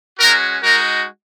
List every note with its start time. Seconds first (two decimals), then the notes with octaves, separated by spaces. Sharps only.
0.19 G#3 C#4 F#4 A#4
0.62 G#3 D#4 F#4 A#4